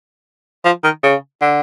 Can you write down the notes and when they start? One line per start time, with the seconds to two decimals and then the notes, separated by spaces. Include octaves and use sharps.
0.65 F3
0.84 D#3
1.03 C#3
1.42 D3